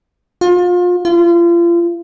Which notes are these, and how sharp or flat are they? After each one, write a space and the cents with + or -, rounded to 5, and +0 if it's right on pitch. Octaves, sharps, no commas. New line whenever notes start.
F4 +30
F4 -35